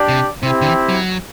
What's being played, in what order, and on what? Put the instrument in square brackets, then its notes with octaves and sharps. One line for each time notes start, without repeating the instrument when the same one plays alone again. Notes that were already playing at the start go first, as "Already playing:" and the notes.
Already playing: [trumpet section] D4 G4 D5
[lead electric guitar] C3
[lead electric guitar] C3 [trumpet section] C4 E4 G4
[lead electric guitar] D3
E3
F#3